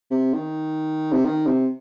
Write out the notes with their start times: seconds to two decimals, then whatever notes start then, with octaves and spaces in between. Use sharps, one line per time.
0.11 C3
0.34 D#3
1.13 C3
1.25 D#3
1.47 C3